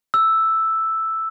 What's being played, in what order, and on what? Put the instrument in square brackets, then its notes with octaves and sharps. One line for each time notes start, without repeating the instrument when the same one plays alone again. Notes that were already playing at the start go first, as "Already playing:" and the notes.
[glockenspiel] E6